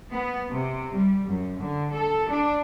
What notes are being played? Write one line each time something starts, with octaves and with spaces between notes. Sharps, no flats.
B3
C3
G3
F#2
D3
A4
D4